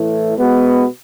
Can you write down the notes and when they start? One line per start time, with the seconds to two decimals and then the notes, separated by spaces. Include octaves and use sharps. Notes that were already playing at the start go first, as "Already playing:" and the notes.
Already playing: A2 E3 A3
0.37 B2 G#3 B3